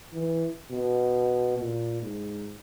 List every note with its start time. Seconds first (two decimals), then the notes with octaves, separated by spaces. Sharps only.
0.13 E3
0.71 B2
1.58 A#2
2.01 G#2